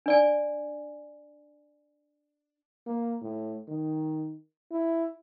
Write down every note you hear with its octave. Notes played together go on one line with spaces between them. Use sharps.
D4 D5 G#5
A#3
A2
D#3
E4